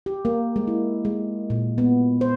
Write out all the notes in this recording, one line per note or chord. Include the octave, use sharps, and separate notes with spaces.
G4
A#3
G#3
E4
G#3
A#2
B3
C5